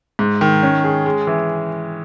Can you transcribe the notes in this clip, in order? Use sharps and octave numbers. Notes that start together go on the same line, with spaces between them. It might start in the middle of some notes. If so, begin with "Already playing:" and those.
G#2
D#3
C#4
G#4
G#3
E3